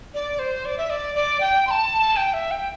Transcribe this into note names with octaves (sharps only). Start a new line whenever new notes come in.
D5
C5
D5
E5
D5
D5
G5
C6
A5
G5
E5
G5